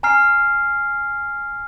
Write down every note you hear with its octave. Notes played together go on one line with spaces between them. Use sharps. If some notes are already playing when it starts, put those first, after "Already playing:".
G#5 A#5 F6 C7